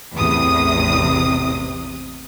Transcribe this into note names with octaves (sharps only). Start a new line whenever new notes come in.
A1 E2 C3 D#6